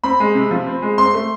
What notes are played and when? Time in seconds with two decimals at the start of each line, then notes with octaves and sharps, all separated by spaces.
0.04 C4 B5
0.20 G#3
0.35 C3
0.51 F3
0.67 C4
0.82 G#3
0.98 C4 C6
1.14 A3